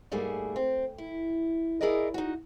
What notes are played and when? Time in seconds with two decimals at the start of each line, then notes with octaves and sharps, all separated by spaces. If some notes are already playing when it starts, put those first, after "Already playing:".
0.11 G#2 G3 A3 A#3 G#4
0.56 C4
0.98 E4
1.81 E4 G#4 A#4 D5 D#5
2.14 D#4 F#4